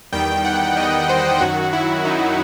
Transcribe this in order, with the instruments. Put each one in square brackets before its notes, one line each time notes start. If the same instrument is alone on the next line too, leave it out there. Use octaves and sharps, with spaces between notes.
[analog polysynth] E2 D#3 G3 G5
F#5
E2 D#3 G3 D#5
C5
F#2 D#3 F#3 F#4
E4
F#2 D#3 F#3 D#4